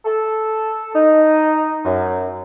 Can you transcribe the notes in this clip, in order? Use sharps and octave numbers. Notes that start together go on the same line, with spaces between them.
A4
D#4
F#2